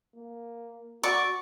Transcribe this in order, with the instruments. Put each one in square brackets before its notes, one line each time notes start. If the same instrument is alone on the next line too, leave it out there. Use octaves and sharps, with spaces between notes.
[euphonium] A#3
[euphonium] F#4 [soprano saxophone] D5 [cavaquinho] C#6